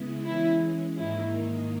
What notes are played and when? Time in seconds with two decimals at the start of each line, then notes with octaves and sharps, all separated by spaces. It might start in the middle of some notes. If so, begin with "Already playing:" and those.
Already playing: C#3 G#3 B3 E4
0.25 E3 G#3 C#4 E4
0.97 G#2 D#3 A#3 D#4 E4